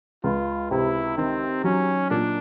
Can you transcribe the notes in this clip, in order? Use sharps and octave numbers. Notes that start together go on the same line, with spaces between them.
C#2 F4
C3 E4
D#3 C4
F#3 C#4
A#2 D4